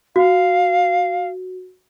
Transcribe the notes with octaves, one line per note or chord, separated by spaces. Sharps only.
F#4 F5